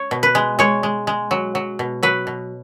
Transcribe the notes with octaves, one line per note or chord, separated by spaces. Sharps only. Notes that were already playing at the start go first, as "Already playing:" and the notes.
Already playing: C#5
B2
B4
G#3
G#3 C#5
G#3
G#3
F#3
F#3
B2
F#3 B4
B2